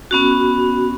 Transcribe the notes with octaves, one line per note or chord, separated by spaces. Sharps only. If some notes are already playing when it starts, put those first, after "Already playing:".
B3 C#4 F#4